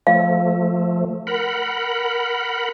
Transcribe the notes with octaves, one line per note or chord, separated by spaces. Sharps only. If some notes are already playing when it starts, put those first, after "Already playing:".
F3 A3 F5
A#4 F#5 B5